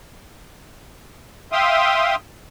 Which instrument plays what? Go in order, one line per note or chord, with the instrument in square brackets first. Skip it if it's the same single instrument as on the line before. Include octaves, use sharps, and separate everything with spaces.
[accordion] E5 F5 G5 C6 D#6